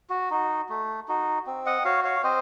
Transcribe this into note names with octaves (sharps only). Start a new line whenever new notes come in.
F#4
D#4 F#4
A3
D#4 F#4
C4
D#5 F#5
F#4 C#5 F5
C#5 F5
C4 C5 D#5